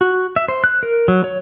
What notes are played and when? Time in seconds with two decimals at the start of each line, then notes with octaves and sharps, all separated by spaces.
0.01 F#4
0.36 E5
0.48 C5
0.64 F#6
0.83 A#4
1.08 F#3
1.24 C#5